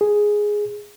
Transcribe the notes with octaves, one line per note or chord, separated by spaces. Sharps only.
G#4